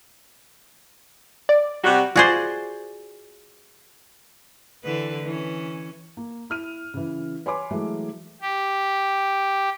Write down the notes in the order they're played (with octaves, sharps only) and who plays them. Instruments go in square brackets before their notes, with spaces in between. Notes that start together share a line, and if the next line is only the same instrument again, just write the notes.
[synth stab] D5
[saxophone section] C3 G3 F#4
[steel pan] F4 D5 [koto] F#4 G#4 C5
[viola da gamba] D3 E3 B4
E3 C#4
[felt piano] A#3
E4 F6 D#7
C#3 E3
B4 C#5 G#5 B5 C6 D6
E3 F#3 G#3 A3
[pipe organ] G4